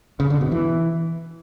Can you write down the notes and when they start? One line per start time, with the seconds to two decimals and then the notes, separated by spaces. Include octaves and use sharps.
0.20 C#3
0.30 D3
0.41 B2
0.52 E3